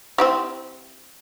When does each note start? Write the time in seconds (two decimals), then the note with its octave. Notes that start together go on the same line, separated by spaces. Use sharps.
0.18 C4 E4 G4